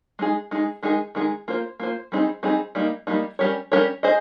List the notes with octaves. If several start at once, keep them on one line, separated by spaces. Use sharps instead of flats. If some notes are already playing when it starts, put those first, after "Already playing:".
G#3 D#4 G#4
G#3 D#4 G#4
D#3 G#3 D#4 G#4
D#3 G#3 D#4 G#4
A#3 F4 C5
A#3 F4 C5
G3 C4 D#4 G#4
G3 C4 D#4 G#4
G3 A#3 D#4
G3 A#3 D#4
G3 C#4 G4 A#4 C#5
G3 C#4 G4 A#4 C#5
G#4 C5 D#5